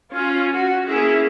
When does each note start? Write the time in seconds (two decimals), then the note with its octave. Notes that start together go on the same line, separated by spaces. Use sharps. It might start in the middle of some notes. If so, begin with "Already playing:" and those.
0.12 C#4 F4
0.52 F#4
0.86 A#3 C#4 E4 G#4